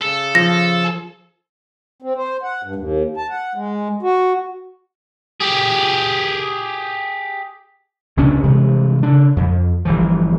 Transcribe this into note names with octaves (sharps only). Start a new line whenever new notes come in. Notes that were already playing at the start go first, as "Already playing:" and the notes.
C#3 A4
F3 A#6
C4
C5
F#5
G2
D#2
A5
F#5
G#3
F#4
G4 G#4
C#2 C3 C#4 D4
G2 C3 E3 G#3
C#3 D4
F2
G1 E3 F3